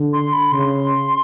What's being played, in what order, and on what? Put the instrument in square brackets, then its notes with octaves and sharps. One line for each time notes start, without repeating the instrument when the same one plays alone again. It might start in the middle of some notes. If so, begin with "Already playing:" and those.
Already playing: [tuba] D3
[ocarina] C6
B5
[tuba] C#3 [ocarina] C6